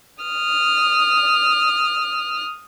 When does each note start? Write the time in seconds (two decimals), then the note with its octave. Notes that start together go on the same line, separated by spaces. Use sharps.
0.23 D#6 F6